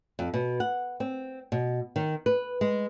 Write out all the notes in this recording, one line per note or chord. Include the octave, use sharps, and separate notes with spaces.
F2
B2
F#5
C4
B2
D#3
B4
G#3